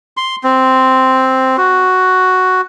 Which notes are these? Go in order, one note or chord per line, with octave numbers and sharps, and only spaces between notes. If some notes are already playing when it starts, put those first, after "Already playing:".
C6
C4
F#4